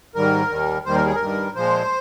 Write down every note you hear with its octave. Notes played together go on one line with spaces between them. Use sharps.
G#2 D#3 G3 A#4
D#2 D#3 G3
D#2 D#3 G3 C5
A#4
G#4
A#4
G2 D#3 G3
A#2 F3 G#3 C5